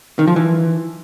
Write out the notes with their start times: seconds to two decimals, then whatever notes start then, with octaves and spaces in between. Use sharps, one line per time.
0.19 D#3
0.28 F3
0.36 E3